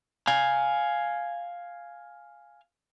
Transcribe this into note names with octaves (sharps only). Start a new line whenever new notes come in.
F5 G#5